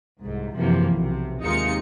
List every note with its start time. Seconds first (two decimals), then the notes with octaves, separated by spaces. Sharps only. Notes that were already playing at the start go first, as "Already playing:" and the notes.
0.21 C2 G#2
0.57 F#2 C3 E3 F3 A#3
0.93 B1 C3
1.43 D#2 C3 G#3 D#4 F4 C#7